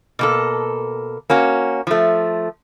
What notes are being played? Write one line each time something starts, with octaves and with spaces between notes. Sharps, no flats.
B2 A#3 A4
A#3 C#4 F#4
F3 A3